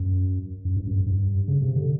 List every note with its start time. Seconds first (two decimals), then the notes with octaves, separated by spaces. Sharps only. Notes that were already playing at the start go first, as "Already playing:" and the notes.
Already playing: F#2
0.65 F#2
0.77 G2
0.88 F#2
1.06 G2
1.48 C#3
1.62 C3
1.76 D3